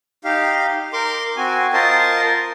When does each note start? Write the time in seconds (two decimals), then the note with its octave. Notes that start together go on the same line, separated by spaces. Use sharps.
0.24 D#4 G4 F5
0.93 A#4 C6 D6
1.37 C4 F#4 G#5
1.73 F4 A#4 C5 D#5 A5